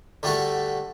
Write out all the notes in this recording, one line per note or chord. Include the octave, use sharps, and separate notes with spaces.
D3 G3 A3 F#4 A4